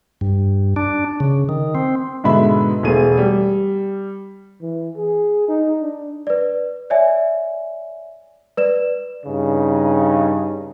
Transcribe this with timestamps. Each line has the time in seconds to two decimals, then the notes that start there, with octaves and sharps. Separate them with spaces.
0.21 G2
0.76 D4
1.20 C#3
1.49 D#3
1.75 C4
2.24 G#2 B2 D3 E5 B5
2.83 E1 A3 G#4 D#7
3.18 G3
4.62 E3
4.97 G#4
5.48 D#4
5.81 D4
6.27 B4 D5
6.90 C#5 D5 E5 G#5
8.57 B4 D5 E7
9.26 G2 C#3 D#4